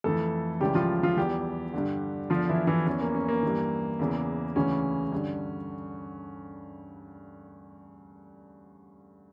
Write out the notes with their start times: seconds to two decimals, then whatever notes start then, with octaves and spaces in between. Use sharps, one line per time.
0.04 F2 E3 A3 A4
0.60 C#2 C#3 E3 G3 G4
0.75 F3 F4
1.03 F3 F4
1.17 E2 E3 G3 G4
1.73 G2 D3
2.30 E2 D3 F3 F4
2.49 E3 E4
2.67 E3 E4
2.86 E2 E3 C#4
3.01 A#3
3.15 C#4
3.28 A#3
3.43 G2 E3
3.99 E2 C#3 E3
4.56 D2 C#3 E3 C#4
5.12 G2 D3